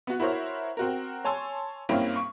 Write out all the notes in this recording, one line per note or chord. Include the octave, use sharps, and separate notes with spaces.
B3 F#4
E4 F#4 A#4 C5 C#5 E5
C4 F#4 A#4
C#5 G#5 A5 C6 E6
G2 A#3 C4 C#4 E4
C#6